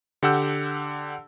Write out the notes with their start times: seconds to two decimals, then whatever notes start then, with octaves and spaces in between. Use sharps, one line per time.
0.23 D3 G4 F#5 E6 G6